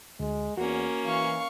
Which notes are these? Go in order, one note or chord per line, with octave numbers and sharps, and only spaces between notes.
D2 G#3
E2 A#3 C#4 F#4
E3 F5 C#6